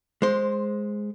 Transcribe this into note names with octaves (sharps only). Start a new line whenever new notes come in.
G#3 C5